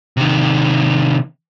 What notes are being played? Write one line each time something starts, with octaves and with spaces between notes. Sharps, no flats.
C3 D#3